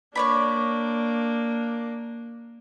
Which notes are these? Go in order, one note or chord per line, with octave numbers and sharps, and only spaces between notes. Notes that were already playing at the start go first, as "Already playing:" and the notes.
A#3 D4 C#5 D5 B5